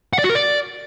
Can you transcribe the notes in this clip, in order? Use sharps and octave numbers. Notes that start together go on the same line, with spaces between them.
F#5
D5
F#4
A#4
D5